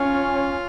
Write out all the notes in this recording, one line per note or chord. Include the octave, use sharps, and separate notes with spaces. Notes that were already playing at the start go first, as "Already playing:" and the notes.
Already playing: C#4 F4